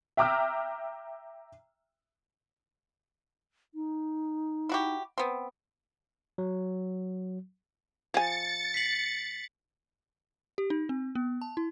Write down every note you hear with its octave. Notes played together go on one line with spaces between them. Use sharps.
E5 G5 A#5 D6 E6 F6
D#4
E4 F#4 G4
B3 C4
F#3
F3 G#5 A6 C#7
B6 C7 F#7
G4
D#4
C4
B3
A5
E4